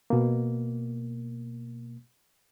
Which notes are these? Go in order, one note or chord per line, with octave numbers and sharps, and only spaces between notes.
B2 A#3